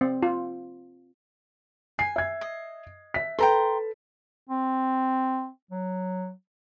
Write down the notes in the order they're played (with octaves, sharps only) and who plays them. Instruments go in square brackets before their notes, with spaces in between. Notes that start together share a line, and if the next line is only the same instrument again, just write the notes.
[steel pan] C4
F4
[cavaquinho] G#5 [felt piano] C7
[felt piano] E5 G#6
[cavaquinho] D#5
[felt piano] E5 B6
[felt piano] A4 B4 [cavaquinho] G5 A#5 C6
[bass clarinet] C4
F#3